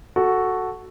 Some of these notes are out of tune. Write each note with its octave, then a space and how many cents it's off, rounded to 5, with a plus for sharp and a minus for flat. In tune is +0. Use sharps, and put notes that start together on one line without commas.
F#4 +0 A4 +0